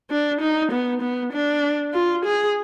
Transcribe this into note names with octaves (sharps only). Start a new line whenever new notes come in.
D4
D#4
B3
B3
D4
F4
G#4